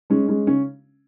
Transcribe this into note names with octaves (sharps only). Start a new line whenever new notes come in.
G#3 C#4
G#3 C#4
C#3 C#4